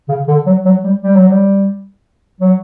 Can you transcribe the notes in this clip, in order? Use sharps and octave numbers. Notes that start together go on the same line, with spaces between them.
C#3
D3
F#3
F#3
G3
G3
F#3
G3
F#3